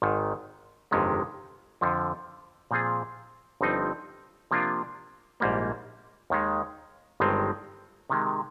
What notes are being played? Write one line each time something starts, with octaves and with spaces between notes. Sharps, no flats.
G#1 G#2 D#3
G1 F2 C3 D#3 G#3
F2 D3 F3
A#2 F3 C4 F4 G#4
G1 G2 F3 C4 D#4
C3 F3 A#3 D4 F4
A#1 G#2 G3 A#3
D#2 D#3 G#3
G1 G2 D#3 G#3 C4
C3 D#3 G#3